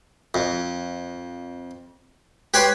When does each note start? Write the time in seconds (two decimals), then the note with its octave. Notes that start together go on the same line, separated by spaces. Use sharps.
0.34 F2
2.54 G4 B4 C#5 G5 C6